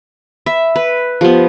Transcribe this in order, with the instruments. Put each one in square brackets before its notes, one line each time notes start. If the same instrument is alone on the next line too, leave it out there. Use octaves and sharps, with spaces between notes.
[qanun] E5 [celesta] B5
[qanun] B4
[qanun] F3 B3 [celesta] F4 G4 C5